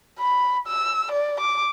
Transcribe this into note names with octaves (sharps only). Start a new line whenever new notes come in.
B5
E6
D5
D6